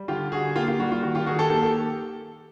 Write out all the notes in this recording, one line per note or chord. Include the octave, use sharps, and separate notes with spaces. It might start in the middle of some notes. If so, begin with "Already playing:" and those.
Already playing: G3
D3 F4 G4
D3 F#4 G#4
A#3 F4 G4
F4 G4
G3 F#4
F4
D#3 F#4
F4 G4
D#3 F#4 G#4
G4 A4
A#3 G4 A4
G4 A4